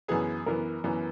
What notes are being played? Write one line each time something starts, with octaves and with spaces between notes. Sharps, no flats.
F#2 E3 B3 G#4
F#2 E3 B3 A#4
F#2 E3 B3